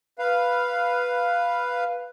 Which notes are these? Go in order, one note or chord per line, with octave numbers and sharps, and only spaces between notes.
B4 F5